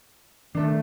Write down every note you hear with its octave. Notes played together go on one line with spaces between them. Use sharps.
D#3 A3 D4 A4